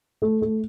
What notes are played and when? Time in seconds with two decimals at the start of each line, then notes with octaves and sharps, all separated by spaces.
0.22 A3
0.42 A3